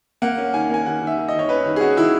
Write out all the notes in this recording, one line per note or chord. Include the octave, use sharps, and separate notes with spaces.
A#3 F#5
C#4
D#3 G#5
A#3 G#5
D#3 F#5
D#3
E5
D#3
D#3 D#5
C#5
C#4 B4
D#3
G#4
C#4 F#4
D#3 E4